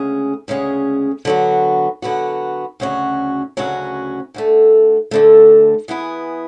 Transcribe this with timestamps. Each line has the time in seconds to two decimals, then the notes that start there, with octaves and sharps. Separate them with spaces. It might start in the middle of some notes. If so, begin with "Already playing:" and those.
Already playing: D2 C#3 G#3 C#4 G#4
0.48 D2 C#3 G#3 C#4 G#4
1.25 D3 F#3 B3 F#4
2.02 D3 F#3 B3 F#4
2.80 D2 C#3 F#3 C#4 F#4
3.57 D2 C#3 F#3 C#4 F#4
4.34 D2 D3 A3
5.11 D2 D3 A3
5.88 E3 B3 E4 G#4